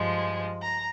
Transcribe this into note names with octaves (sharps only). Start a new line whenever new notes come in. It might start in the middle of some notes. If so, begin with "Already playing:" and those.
Already playing: G2 F3 G#3
A#5